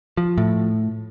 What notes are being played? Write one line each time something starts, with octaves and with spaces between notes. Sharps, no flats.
F3
A2